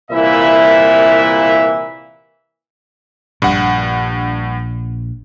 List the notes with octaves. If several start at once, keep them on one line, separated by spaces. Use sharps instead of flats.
C2 A#2 E3 A#3 E4 E5
A#1 G2 A#2 F#5